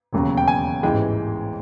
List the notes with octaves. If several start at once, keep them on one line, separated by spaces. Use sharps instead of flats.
E1 D#2 C#3 F#3
G5
G#5
A1 G#2 E3 G#3 G5